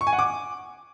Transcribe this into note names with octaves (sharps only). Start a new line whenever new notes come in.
C#6
G#5
F#5
D6